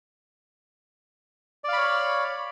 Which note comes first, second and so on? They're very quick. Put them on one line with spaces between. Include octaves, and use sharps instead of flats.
D5 F5 B5 C#5